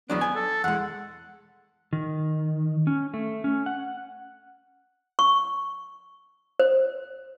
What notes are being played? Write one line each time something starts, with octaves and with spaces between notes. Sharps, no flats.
E2 F#3 B3 D4
G#5
A4
E2 G#3 F#5
D#3
C#4
A3
C#4
F#5
C#6
C5